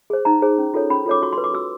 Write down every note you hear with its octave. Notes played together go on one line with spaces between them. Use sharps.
G#4 C5
D#4 A#5
G#4 C5
C#4
F4 A4 C#5
C#4 B5
F4 A4 C#5 D6
F#4 C#6
C6
B4
D6
F#4 E6